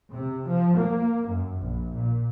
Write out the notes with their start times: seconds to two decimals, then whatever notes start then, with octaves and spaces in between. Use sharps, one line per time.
0.13 C3
0.48 F3
0.78 A#3
1.28 F#2
1.61 A#1
1.94 A#2